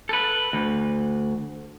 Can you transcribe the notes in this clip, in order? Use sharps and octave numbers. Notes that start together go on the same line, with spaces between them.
A4 B4
D2